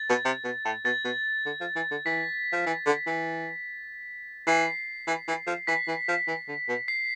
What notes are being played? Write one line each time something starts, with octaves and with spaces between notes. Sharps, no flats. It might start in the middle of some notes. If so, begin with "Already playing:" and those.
Already playing: A6
B2
C3
B2
A2
B2 A6
B2
D3
F3
E3
D3
E3 B6
F3
E3
D3
E3
E3 C7
E3
E3
F3
E3 B6
E3
F3
E3
D3
B2
C7